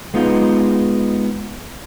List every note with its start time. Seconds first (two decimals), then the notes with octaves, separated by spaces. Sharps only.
0.14 G#3 B3 D#4 F4